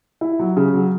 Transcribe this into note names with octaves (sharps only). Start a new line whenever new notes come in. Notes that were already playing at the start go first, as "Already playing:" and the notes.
E4
F#3
C#3
F#3